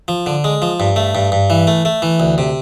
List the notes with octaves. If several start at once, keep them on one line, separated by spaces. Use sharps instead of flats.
F3
D3
G#3
F3
G2
A3
G2
G2
E3
A3
A3
E3
D2
C3